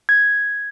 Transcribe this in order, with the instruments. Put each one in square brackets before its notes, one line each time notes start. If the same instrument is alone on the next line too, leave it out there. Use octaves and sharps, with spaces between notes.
[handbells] G#6